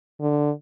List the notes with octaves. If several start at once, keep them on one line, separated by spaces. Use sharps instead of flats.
D3